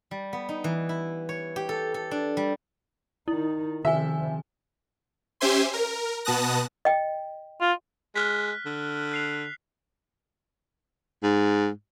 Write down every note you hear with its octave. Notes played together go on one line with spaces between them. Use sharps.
G3
B3
D#4
E3
E4
C#5
G4
A4
A4
D4
G3
D#3 D#4 E4
C3 D#3 F3 E5 G#5
C#4 G4 C5 E5 G#5 C6
A#4
B2 B3 A5 D#6 F#6 A#6
D#5 G5
F4
G#3 F6 F#6 B6
D3
F#6 C7 F7
G#2